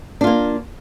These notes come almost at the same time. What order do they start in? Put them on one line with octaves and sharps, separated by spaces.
D4 F4 A#3